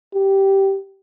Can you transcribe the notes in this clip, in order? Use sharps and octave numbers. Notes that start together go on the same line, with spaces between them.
G4